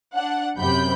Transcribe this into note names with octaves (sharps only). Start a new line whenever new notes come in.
D4 F#5
F#2 C3 B5 G6